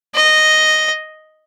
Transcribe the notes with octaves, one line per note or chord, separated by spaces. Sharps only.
D#5